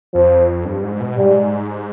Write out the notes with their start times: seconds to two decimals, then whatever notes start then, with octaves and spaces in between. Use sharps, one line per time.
0.14 F2 F3
0.65 G2
0.83 G#2
1.00 B2
1.17 G#2 G3